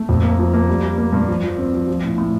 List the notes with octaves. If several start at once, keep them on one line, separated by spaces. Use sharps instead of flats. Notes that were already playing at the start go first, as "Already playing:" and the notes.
Already playing: A3
F2
A#3
F3
A#3
G3
G3
A#3
G2
F3
F3
C4
F3
F3
A2
A2